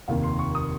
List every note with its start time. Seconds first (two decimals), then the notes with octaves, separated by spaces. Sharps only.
0.08 F1 D#2 D#3 F5
0.23 C6
0.39 C#6
0.55 D#6